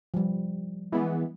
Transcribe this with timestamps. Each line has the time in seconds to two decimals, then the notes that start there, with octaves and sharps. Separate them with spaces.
0.14 F3 G3
0.92 E3 G#3 B3